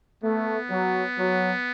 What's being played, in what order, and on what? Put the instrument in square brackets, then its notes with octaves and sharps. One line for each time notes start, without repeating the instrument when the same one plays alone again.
[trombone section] A3 [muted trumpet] B3
[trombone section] F#3
F#3